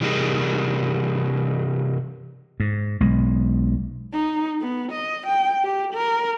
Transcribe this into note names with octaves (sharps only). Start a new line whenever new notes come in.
C3 E3 G3 D#4 G#4 A#4
G#2
B1 G#3
D#4
B3
D#5
G5
G4
A#4